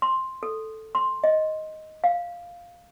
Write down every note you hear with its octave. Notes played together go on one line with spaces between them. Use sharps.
C6
A4
C6
D#5
F5